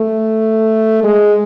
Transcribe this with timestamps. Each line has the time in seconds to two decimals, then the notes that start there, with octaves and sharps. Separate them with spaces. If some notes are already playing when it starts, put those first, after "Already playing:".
Already playing: A3
1.03 G#3